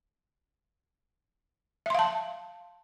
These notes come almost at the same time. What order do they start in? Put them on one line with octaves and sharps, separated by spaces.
E5 C6 F5 A5